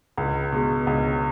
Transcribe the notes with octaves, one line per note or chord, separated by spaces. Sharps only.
C#2
B2 G#3
C#2